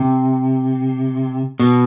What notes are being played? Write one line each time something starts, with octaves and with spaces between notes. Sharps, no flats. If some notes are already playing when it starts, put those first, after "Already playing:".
Already playing: C3
B2